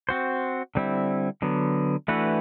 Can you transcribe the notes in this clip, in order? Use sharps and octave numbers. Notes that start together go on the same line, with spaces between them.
C4 F#4 C5
D3 G3 C4 E4
D3 F#3 B3
E3 A3 D4 F#4 B4